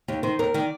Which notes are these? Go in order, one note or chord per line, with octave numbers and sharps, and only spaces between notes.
D#2 G4
D#3 C5
D#2 A#4
D#3 D5